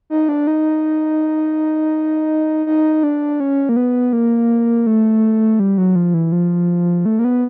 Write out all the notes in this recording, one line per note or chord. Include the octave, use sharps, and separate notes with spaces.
D#4
D4
D#4
D#4
D4
C#4
A#3
B3
A#3
A3
G3
F#3
F3
E3
F3
A3
A#3
B3